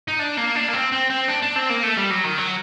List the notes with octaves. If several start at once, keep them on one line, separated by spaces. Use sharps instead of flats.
D#4
D4
A#3
D4
A#3
C4
C4
C4
D4
D4
C4
A#3
A3
G3
F#3
D#3
F#3